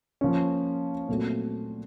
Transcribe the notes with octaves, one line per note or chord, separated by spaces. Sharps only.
F3 A#3 C#4
A#2 F#3 A3 C4